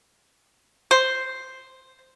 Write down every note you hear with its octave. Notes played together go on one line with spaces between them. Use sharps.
C5